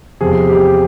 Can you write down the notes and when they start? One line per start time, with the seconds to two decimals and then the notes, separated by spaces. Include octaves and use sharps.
0.20 E2 C3 F3 G#4
0.49 G4